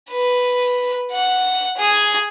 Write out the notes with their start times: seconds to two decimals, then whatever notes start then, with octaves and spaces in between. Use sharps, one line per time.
0.10 B4
1.12 F#5
1.77 G#4